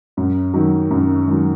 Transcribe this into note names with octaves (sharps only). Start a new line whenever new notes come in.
F#2
D#3 F#3
F#2
D#3 F#3